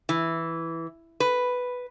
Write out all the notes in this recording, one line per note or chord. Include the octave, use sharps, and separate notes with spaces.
E3
B4